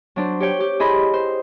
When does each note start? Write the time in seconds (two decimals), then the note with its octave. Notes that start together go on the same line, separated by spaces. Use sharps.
0.16 F#3 D4 C5
0.40 G4 C#5 G5
0.60 G4
0.80 E4 G#4 D#5 B5 C6
1.14 C5